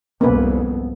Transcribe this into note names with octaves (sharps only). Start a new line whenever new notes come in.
C2 F2 G#2 A#3 B3 C#4 B4